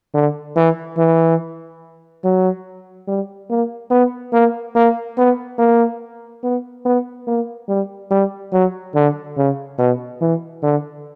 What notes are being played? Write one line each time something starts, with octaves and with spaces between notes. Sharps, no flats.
D3
E3
E3
F#3
G3
A#3
B3
A#3
A#3
B3
A#3
B3
B3
A#3
G3
G3
F#3
D3
C#3
B2
E3
D3